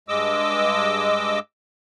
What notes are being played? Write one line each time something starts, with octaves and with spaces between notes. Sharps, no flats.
G2 G#3 D#5 D6 E6